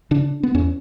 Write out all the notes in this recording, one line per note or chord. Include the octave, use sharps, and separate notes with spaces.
C#3 D4
B3
E2 C#4